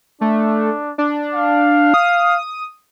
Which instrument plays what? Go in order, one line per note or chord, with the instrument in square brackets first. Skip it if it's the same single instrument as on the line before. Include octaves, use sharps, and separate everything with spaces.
[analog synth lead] A3 [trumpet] D4
[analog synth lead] D4
[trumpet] F5
[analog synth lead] D#6